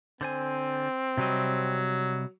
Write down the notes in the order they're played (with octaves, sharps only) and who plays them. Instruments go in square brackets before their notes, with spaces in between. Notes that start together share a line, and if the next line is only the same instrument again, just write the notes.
[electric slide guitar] D3 C5 G#5 [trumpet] C4
[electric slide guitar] C3 G3 D#5 [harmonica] F#3